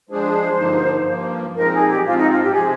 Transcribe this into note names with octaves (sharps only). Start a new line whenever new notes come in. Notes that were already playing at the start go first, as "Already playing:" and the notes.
F3 G#3 D4 G#4 C5
G2 D3 F3 A#3 D#4
G2 F3 A#3
A#2 F3 G#3 C4 D#4 A#4
G#4
G4
G#2 F3 C4 F4
D#4
F4
G4
C3 F3 G#3 C4 G#4